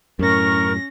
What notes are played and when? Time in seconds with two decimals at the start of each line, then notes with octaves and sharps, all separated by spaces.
0.19 F#2 A2 C#4 A#4 C#6 A#6